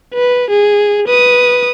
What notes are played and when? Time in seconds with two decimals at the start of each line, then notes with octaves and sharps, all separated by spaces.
0.14 B4
0.50 G#4
1.08 B4 D#6